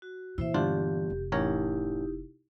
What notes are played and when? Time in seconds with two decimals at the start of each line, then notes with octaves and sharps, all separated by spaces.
0.02 F#4
0.38 A#2 E3 E4 C5 E5
0.54 G1 D4 F4 G4
1.10 F1
1.32 A1 D#4 E4 G4 A#4 C#5